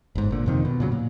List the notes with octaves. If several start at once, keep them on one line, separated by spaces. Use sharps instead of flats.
G1 G#2
A#2 D3
F2 C3 D#3
B2
A#2 C#3 F#3
A#2